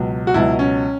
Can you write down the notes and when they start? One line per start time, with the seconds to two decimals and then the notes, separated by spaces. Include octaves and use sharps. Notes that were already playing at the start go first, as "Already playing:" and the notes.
Already playing: C#2 B2 F#3
0.27 F#4
0.34 C#2 B2 F#3 E4
0.59 C#4